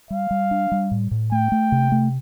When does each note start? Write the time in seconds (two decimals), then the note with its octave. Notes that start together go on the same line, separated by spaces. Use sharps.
0.10 G3 F5
0.31 G3
0.51 D4
0.72 G3
0.91 A2
1.11 A2
1.32 A3 G5
1.52 A3
1.72 C3
1.92 A3